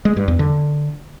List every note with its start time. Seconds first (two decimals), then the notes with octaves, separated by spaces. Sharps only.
0.05 G#3
0.17 G2
0.28 E2
0.39 D3